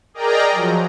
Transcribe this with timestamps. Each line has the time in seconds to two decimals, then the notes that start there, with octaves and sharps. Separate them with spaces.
0.14 G#4 A#4 D5 D#5 G5 A#5
0.51 F3 F#3